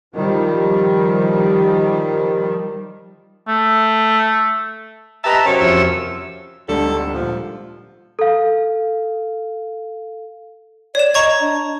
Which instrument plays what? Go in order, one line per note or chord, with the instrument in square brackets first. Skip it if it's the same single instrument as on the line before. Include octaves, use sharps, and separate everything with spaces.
[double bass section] D#3 F3 G3
[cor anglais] A3
[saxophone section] G4 B4 D#5 [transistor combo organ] E5 A5 [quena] A#5
[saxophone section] F#2 C3 [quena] C#5
[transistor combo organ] F2 E6
[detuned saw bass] D2 [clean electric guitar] G#2 D3 G3 [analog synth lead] D4 [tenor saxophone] A4
[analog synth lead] A#2 [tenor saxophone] F3
[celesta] A4 F5
[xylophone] C#5 E7 [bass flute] D5
[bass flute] D#5 [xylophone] A#5 C#6 G#6
[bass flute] D4